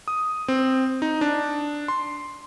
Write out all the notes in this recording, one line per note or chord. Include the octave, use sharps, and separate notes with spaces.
D#6
C4
D#4
D4
C6